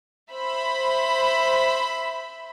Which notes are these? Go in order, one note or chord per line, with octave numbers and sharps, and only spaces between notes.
C5 E5 B5